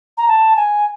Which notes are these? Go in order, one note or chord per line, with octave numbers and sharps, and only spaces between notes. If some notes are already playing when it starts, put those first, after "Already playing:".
A#5
A5
G#5